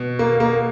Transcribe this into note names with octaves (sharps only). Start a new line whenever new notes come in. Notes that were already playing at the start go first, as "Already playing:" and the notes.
Already playing: B2
A#3
A#3